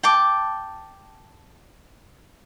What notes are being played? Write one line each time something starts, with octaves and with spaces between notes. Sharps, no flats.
G5 A5 D6